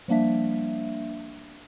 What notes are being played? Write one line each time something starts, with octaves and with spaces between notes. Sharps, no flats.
F3 G3 A#3 D4 E5